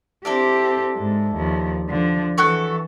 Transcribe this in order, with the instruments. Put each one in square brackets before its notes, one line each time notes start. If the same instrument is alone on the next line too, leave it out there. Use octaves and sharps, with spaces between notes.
[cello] C4 G4 [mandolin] D4 E4 A4
[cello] G#2
D#2 F3
D3 F3
[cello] E3 [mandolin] F#4 A4 C#5